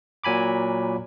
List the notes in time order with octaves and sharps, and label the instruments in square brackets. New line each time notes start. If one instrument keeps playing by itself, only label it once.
[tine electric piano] A#2 F#3 G#5 B5 D6